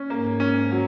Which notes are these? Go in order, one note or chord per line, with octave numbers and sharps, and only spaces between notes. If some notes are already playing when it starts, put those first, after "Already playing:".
Already playing: C#4
G#2 A#3
C#4
F#3